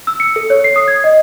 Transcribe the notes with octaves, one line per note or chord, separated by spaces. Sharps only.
E6
C#7
A4
C#5
C7
D#6
G#6
D#5